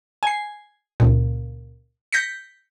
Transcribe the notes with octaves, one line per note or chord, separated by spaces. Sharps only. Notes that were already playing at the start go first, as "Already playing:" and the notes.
G#5 C7
C#2 A#2
G6 A#6 B6 C#7